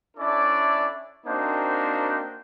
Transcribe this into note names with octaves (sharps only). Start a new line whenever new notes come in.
C#4 D4 E4 A4 D5
A#3 C4 D4 D#4 F#4 C5